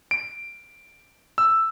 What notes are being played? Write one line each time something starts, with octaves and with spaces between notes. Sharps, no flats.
D7
E6